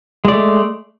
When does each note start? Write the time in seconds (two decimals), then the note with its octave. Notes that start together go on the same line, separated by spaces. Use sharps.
0.25 G#3
0.28 D5
0.32 A3